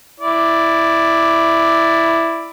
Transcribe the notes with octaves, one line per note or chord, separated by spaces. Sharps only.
E4 D5